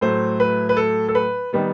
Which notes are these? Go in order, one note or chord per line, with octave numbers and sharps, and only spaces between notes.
A2 F#3 A3 C5
B4
B4
A4
A4
B4
D#3 G3 B3